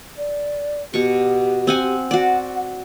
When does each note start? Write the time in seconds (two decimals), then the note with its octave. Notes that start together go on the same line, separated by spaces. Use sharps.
0.18 D5
0.94 B2 G4 C#6
1.67 C4 F#5 G#5
2.11 F#4 D5 F#5